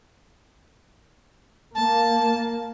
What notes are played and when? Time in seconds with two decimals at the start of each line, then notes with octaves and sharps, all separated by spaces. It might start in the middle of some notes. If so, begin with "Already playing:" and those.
1.75 A#3 A5